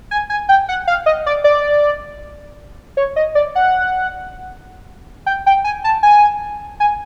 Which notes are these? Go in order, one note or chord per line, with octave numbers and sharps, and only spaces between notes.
G#5
G#5
G5
F#5
F5
D#5
D5
D5
C#5
D#5
D5
F#5
G5
G5
G#5
A5
G#5
G#5